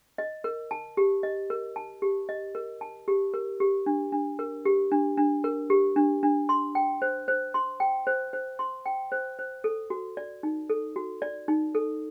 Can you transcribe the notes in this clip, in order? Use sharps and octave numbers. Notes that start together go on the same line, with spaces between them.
D#5
A#4
A5
G4
D#5
A#4
A5
G4
D#5
A#4
A5
G4
A#4
G4
D4
D4
A#4
G4
D4
D4
A#4
G4
D4
D4
C6
G5
C5
C5
C6
G5
C5
C5
C6
G5
C5
C5
A4
F#4
D5
D#4
A4
F#4
D5
D#4
A4